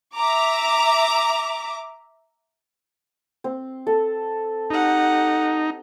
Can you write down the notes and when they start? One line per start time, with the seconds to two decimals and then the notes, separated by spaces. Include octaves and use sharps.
0.15 E5 A#5 D6
3.44 C4
3.87 A4
4.70 D#4 G4 F#5